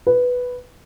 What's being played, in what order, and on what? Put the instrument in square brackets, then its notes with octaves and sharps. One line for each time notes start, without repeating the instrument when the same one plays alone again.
[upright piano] B4